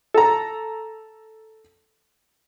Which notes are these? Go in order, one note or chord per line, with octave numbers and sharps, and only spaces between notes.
A4 A#5